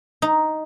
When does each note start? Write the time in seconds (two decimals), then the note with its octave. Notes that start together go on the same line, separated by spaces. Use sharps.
0.22 D#4